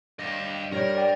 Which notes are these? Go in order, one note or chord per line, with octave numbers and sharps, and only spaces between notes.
G2 G4 D#5 F5
G3 A#4 C#5
D5 G5